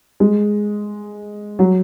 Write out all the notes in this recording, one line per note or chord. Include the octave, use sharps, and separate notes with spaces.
G#3
F#3